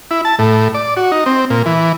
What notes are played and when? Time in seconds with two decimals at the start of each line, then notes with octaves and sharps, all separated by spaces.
0.11 E4
0.25 A5
0.39 A2
0.74 D5
0.97 F#4
1.12 D#4
1.26 C4
1.50 A#2
1.66 E3